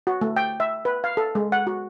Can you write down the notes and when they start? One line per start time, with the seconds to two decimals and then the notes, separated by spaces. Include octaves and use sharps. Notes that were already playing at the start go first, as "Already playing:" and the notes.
0.07 F#4
0.21 A3
0.37 G5
0.60 E5
0.85 B4
1.04 F5
1.17 A4
1.35 G#3
1.52 F#5
1.67 F#4